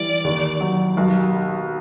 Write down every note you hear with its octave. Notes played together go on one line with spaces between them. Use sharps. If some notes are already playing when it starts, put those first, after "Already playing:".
Already playing: E3 G3 D5
D#2
F#3
B1